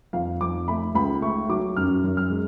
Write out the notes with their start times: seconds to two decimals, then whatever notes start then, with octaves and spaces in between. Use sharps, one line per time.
0.13 F2 F5
0.41 F2 D6
0.68 A3 B5
0.95 C#2 B5
1.22 A3 C#6
1.49 F#3 D6
1.77 F#2 F6
2.04 F#2
2.17 F6
2.30 G#3